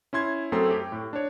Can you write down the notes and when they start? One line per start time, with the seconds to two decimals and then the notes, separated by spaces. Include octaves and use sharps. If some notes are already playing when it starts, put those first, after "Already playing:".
0.13 C#4 E4 C6 G#6
0.52 F#2 A3 C4 A4 C6
0.71 G4
0.92 A2
1.13 D4 C#5